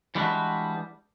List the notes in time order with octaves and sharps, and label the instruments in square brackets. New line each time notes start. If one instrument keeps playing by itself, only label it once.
[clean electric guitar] E3 G3 G#3 D4 F#4 B4